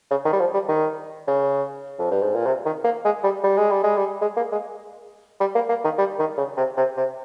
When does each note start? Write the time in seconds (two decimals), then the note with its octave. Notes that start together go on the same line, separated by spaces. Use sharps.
0.11 C#3
0.25 D#3
0.33 G3
0.40 F3
0.54 G3
0.68 D#3
1.28 C#3
1.99 F2
2.11 G2
2.22 G#2
2.34 A#2
2.46 C3
2.65 D#3
2.84 A#3
3.05 G#3
3.23 G3
3.44 G3
3.57 G#3
3.71 G3
3.84 G#3
3.97 G3
4.21 G#3
4.36 A#3
4.52 G#3
5.40 G3
5.55 A#3
5.69 A#3
5.84 D#3
5.98 G3
6.19 D#3
6.37 C#3
6.57 C3
6.77 C3
6.97 C3